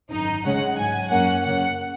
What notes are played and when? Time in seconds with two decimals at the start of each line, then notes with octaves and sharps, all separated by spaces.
0.11 G#1 F#2 D#3 D#4
0.45 C#2 C#3 G#3 C#4 F#5
0.77 G#2 F#3 C#4 G#5
1.10 F#2 F#3 A#3 C#4 F#5
1.44 F#2 C#3 A#3 C#4 F#5